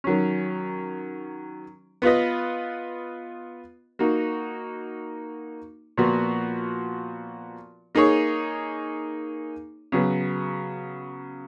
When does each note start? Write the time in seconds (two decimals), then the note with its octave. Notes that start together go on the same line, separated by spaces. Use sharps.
0.04 D#3 F#3 C#4
2.02 B3 F4 B4 D#5
3.99 A#3 D#4 F#4
5.97 A#2 F3 B3 F#4
7.95 A#3 D#4 G#4 C#5
9.92 C#3 F#3 B3